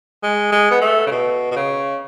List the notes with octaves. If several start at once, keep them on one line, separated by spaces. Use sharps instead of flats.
G#3
G#3
B3
A3
C#3
B2
B2
C#3